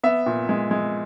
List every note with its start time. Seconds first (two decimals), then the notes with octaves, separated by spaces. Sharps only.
0.03 B3 E5
0.26 A#2
0.49 G#3
0.71 G#3